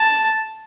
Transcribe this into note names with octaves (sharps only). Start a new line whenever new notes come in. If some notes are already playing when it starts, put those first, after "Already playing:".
Already playing: A5